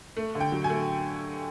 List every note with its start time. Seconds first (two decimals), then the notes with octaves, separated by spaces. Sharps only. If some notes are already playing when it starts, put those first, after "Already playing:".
0.17 A3
0.35 D3
0.40 G5
0.52 F#3
0.64 G#5
0.70 A3